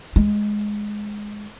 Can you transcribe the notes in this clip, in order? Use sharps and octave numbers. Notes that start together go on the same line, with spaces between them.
G#3